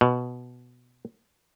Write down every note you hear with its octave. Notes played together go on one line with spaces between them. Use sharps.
B2